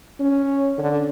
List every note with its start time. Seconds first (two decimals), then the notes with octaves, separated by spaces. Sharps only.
0.20 C#4
0.78 D3